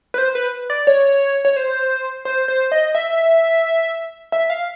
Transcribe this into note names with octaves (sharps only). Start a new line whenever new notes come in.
B4
C5
B4
D5
C#5
C#5
C5
C5
C5
D#5
E5
E5
F5